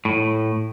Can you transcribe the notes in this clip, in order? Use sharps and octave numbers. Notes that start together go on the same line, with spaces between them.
A2